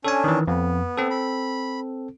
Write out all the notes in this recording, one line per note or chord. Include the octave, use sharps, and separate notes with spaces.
C#4 D4 A4 G#5
D#3 E3
F2 B3
C4 A4
B5